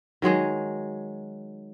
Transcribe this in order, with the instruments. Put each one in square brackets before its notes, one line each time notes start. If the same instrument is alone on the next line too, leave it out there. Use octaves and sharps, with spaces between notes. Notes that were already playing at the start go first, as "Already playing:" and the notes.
[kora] D#3 F#3 G#3 G#4